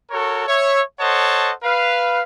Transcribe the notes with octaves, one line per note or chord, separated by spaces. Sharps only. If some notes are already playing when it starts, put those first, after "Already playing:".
F#4 A4 A#4 C#5
C#5 E5
A4 C5 C#5 D#5 F#5 A5
B4 F5